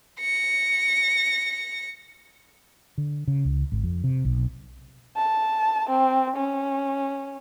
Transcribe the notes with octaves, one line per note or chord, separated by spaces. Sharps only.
A#6 C#7
D3
C#3
C#2
G#1
F2
C3
B1
A5
C4
C#4